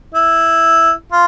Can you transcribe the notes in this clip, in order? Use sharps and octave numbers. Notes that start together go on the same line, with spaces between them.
E4
F4